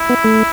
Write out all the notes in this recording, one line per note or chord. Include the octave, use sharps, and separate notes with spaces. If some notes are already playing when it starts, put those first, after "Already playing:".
Already playing: E4
B3
A3